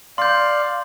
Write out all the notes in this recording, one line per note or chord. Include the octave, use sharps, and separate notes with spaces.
D5 F5 C6 G6